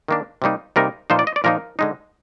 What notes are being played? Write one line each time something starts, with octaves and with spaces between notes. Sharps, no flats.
D#3 A#3 D4
C3 G3 A#3 D#4
C3 G3 A#3 D#4 A#4
A#2 F3 A#3 D#4 C5
D5
D#5
D5
A#2 F3 A#3 D#4 A#4
D3 G#3 D#4